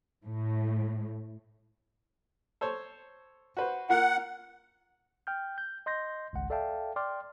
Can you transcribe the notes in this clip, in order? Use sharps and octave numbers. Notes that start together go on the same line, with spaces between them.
A2
A4 C5 C#5
F#4 B4 C5
A#3 F4 A#4 F#5
G5 F6 G6
G6
D#5 C6 G6 A#6
G#1 C#2 F#5
A4 D5 E5 F5 G5 A5
D5 G5 C6 D6 F6